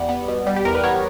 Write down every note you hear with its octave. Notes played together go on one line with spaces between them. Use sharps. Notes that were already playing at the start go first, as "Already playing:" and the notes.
Already playing: E2 G3 D5 F#5
B3
B2
G3
G4
E2 A#4
B4
B3 A#4 C#5